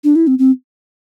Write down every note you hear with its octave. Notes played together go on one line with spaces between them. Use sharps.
D4
E4
C4
C4